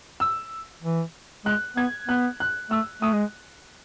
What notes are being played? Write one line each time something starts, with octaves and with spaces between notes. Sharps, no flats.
E6
E3
G#3 F#6
B3 G#6
B3 F#6
F#6
A3 E6
A3 D#6
G#3